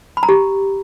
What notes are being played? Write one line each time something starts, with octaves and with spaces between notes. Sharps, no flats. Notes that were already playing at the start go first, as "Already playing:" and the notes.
B5
A#5
G4